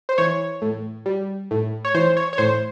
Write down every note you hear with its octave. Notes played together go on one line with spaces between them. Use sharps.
C5
E3 C#5
A2
G3
A2
C#5
E3 C5
C#5
C#5
A2 C5